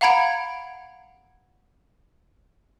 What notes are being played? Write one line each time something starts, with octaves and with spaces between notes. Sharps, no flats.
F5 F#5 A#5 B5 G#6 D7